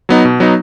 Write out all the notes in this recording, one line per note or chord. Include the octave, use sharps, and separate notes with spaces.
F#3 B3 D#4
B2
F#3 B3 D#4